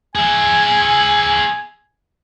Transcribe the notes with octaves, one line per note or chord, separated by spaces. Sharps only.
G#4 E5 G#5